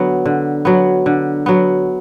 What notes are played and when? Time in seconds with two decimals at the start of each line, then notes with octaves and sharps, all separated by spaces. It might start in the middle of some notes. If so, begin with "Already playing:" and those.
Already playing: D3 F#3 B3
0.25 D3
0.65 F#3 B3
1.06 D3
1.46 F#3 B3